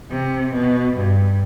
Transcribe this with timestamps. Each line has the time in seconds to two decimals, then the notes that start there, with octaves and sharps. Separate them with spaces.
0.11 C3
0.53 B2
0.97 G2